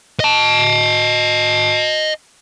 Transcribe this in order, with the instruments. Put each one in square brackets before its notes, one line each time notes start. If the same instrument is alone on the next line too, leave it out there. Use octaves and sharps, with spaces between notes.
[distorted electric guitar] D#5 A5